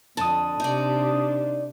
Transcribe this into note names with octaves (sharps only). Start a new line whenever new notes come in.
F2 D3 A5 D#6
C3 D4 D#4 D5